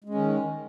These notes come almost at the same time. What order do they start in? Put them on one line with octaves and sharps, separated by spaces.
G#3 C#4 D#3